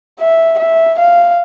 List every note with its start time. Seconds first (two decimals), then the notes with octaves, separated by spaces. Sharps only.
0.20 E5
0.59 E5
0.99 F5